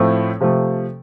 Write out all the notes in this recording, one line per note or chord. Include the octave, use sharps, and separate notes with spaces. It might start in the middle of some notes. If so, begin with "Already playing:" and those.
Already playing: A2 F3 A3 C4 E4
C3 F3 A3